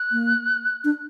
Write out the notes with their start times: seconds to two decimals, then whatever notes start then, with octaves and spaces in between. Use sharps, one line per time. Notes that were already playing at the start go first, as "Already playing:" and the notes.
Already playing: F#6
0.12 A#3
0.84 D4